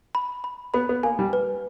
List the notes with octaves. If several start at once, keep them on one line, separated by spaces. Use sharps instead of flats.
B5
B5
B3 B5
B3
A#3 G#5
G3
B4